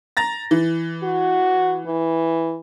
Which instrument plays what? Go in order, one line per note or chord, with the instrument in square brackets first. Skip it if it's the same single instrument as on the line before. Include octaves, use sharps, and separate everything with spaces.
[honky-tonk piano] A#5 A6 A#6
E3
[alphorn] F#4
E3